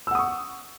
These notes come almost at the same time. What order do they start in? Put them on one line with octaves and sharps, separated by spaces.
E6 F#5 D#6 C#6